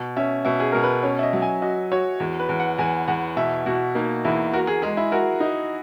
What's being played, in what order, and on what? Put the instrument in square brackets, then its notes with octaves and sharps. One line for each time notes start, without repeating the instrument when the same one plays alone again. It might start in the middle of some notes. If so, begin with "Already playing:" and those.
Already playing: [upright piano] B2
[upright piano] C#4 [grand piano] E5
[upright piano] B2 [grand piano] E5
[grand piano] G#4
[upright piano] B2 [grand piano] A#4
[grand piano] B4
[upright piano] C#4 [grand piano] C#5
[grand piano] E5
D#5
[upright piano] F#3
[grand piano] G#5
[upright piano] F#4 [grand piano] D#5
[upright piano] F#4 [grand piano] C#5
[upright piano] E2
[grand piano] B4
[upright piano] E2
[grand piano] F#5
[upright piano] E2 [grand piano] G#5
[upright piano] E2 [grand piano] F#5
[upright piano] B2 [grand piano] E5
[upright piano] B2 [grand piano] F#4
[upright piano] A#3 [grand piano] D#4
[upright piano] E2 [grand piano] E4
[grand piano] F#4 [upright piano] A#4
[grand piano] G#4
[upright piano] G#3 [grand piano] G#4
[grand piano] E4
[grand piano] F#4 [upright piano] A#4
[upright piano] D#4